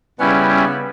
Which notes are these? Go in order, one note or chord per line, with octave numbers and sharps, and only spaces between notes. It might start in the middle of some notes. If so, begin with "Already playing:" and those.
C#3 G3 B3 C#4 E4